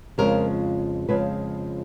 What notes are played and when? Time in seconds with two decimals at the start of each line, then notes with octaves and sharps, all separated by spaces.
0.18 F2 C#3 F3 G#3 A#4
1.08 F2 C#3 F3 G#3 B4